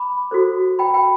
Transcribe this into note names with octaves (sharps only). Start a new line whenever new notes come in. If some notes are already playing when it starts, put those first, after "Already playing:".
Already playing: B5 D6
F#4 A4 C5
G5 B5
G5 B5